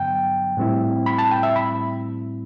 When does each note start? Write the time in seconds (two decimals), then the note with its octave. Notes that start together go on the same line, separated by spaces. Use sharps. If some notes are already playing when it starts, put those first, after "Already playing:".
Already playing: G2 D3 F#3 B3 G5
0.57 A2 G3 C4 E4
1.06 B5
1.19 A5
1.31 G5
1.43 E5
1.56 B5